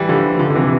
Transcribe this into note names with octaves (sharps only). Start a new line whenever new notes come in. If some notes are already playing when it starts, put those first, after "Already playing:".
Already playing: E3 G3
D3 F3
D3 F3
D3
C3 E3